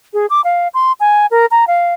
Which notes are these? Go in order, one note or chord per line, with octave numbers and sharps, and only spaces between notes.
G#4
D6
F5
C6
G#5
A#4
A#5
F5